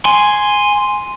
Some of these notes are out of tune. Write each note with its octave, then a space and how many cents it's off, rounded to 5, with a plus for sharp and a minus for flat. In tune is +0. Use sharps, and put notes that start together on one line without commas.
G#5 +0 C6 +0